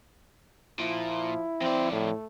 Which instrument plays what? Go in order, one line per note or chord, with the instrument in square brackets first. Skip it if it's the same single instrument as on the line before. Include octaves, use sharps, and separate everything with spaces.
[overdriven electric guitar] A#2 [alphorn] F3 [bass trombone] E4
[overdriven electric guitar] F2 D5 [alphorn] C4
[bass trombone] A2 [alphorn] A3